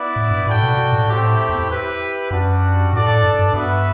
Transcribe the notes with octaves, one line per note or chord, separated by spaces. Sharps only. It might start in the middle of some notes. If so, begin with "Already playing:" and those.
Already playing: B3 E4 B4 D5
A2
G2
A2 F#4 A4 D5 G5
B2
B2
A2
A2 A3 C4 E4 G4
E2
E4 G4 B4
F#2 G3 D4 F#4
A2 D4 A4 D5
A2
G2
G2
G2 B3 F#4 B4 E5